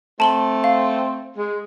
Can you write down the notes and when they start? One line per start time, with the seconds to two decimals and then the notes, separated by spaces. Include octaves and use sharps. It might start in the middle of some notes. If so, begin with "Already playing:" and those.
0.20 A3 C4 A5 F#7 G7
0.64 F5
1.37 G#3